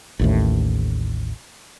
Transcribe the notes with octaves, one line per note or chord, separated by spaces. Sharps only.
A1 D#2 A2